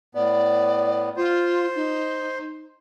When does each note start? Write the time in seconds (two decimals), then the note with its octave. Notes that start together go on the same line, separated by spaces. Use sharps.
0.15 A2 B3 D5
1.17 F4 C5
1.76 D#4